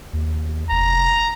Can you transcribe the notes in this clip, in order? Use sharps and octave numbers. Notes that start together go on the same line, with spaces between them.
D#2
F1 A#5